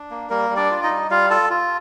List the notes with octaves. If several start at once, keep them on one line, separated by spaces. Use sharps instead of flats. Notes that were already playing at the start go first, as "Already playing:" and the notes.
Already playing: D4
A#3
G3 A#3 A#4
G3
D4 D5
F4
D#4 D#5
G3
G3 F4 F5
F4 A4 A5
F4